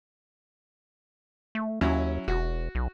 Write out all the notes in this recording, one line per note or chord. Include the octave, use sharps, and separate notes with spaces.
A3
D#2 F#3 C#4 E4
E1 F#4
B1